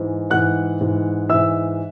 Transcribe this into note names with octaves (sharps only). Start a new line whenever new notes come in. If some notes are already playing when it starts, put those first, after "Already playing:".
Already playing: G#2 E3
G#2 E3 F#5 F#6
G#2 E3
G#2 E3 E5 E6